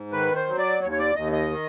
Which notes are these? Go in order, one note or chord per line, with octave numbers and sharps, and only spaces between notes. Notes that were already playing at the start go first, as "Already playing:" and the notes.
Already playing: G#2
D#3 B4
C5
F#3
D5
D#2 C#5
C#5
D5
D#2 D#5
D#5
D#3